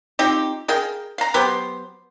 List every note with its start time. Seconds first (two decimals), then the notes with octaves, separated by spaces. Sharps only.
0.19 C4 D#4 F4 G4
0.68 G#4 A#4 F5 G5
1.18 F5 A#5
1.34 F#3 B3 G4 C5